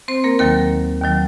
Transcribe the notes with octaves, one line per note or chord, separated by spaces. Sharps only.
C4 C5
A#3 A#4
D#2 D#3 F#3 A#3 A#4
D#2 D#3 F#3